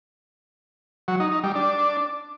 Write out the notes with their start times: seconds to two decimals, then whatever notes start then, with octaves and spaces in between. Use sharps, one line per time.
1.08 F#3
1.20 D#4
1.32 D#4
1.44 G3
1.55 D4